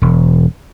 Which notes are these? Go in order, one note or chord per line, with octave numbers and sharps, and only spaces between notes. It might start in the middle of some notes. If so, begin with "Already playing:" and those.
E1